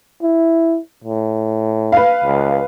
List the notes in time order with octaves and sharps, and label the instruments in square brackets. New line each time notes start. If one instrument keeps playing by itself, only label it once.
[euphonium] E4
A2
[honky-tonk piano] B4 F5
[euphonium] C#2